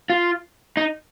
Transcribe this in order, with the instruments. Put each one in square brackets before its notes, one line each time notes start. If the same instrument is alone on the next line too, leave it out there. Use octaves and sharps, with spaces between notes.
[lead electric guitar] F4
D#4